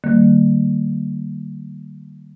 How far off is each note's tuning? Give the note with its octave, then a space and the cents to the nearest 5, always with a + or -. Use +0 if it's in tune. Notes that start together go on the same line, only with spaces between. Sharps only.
D3 +45 G3 -30 A#3 -25